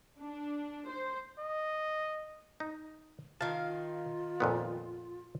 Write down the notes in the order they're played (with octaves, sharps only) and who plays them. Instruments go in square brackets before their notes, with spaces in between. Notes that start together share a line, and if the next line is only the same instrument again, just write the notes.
[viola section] D4
C5
[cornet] D#5
[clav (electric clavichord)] D#4
[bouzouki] D#3 F5 [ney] F4 [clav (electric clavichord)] A5
[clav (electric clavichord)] F2 A#2 B3